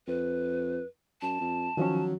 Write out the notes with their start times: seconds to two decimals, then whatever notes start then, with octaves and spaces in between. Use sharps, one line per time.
0.07 F2 B4
1.22 F#2 A5
1.40 F2
1.77 D#3 F3 F#3 C#4